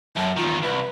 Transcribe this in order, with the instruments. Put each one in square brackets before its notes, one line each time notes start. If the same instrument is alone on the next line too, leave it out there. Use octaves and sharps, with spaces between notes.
[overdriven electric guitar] F#2 [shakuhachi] A5
[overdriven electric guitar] E2 D#3 [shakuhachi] F4
[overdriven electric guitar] C2 [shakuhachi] B4